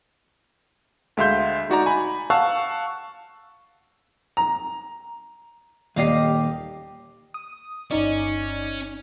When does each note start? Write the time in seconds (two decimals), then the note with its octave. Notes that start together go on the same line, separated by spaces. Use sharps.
1.17 D2 G#3 E5 F5 C6 G6
1.70 D#4 F#4 D5 A#5
1.86 G#5 B5
2.30 F5 F#5 A5 C#6 E6 F#6
4.37 A#5
5.96 D#1 D#2 G4 D5 D#5 F5 C7
7.34 D#6
7.91 G1 C#4 D#4 D5